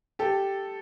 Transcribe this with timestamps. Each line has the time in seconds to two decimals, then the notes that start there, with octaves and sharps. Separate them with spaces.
0.19 G4 A4